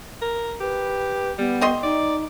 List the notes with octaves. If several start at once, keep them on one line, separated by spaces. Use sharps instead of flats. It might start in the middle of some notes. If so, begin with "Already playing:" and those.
A#4
G4 B4
G3 B3
G4 D#5 C6
D#4 D5